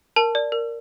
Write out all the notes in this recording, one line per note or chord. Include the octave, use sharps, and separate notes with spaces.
A#4 A5
D5
A#4